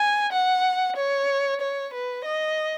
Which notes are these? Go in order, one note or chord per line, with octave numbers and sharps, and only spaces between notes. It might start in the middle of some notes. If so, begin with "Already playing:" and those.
Already playing: G#5
F#5
C#5
C#5
B4
D#5